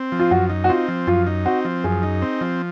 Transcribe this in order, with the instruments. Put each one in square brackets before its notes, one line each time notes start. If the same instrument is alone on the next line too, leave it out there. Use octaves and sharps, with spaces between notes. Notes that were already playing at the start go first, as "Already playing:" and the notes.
Already playing: [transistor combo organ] C4
F3
[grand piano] F4
[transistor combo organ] F#2 [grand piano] F#4
[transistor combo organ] D#4
[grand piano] F#4
[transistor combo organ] C4 [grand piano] F4
[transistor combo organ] F3
[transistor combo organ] F#2 [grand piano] F4
[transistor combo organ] D#4
[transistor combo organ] C4 [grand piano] F#4
[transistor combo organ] F3
[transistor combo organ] F#2 [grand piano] G#4
[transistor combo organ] D#4
C4
F3